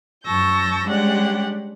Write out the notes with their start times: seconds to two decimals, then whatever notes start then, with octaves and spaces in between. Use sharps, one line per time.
0.24 F#2 A5 C#6 E6 G6 A#6
0.86 G3 G#3 C#4 D4 G4 F#5